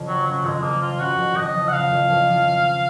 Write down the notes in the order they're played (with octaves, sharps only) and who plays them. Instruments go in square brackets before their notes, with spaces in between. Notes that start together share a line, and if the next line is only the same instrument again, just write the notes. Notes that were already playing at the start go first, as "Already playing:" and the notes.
Already playing: [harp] F2 C#3
[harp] F3 [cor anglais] F#3
[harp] C#3 [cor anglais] F#3
[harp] F2 [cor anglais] G#3
[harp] F2 [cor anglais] A#3
[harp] F3 [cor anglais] F4
[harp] C#3 [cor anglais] F#4
[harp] F2
[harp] F2 [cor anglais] D#5
[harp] F3
[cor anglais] F#5
[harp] C#3 [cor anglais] F5
[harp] F2
F2
F3